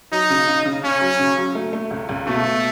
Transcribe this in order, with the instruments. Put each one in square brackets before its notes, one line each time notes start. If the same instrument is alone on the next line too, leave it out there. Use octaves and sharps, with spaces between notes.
[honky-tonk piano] F#3 [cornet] D#4
[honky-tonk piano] C#3
C#3
C#3
[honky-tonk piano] C#3 [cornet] C#4
[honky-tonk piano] F#3
C#3
F#3
A3
A3
C#2
C#2
[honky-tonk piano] B2 [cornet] A3
[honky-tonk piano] B2